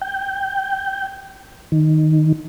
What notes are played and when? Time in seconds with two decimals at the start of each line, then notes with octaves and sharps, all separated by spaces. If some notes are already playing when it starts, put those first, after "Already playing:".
0.01 G5
1.72 D#3